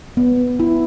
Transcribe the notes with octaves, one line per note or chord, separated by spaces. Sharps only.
B3
E4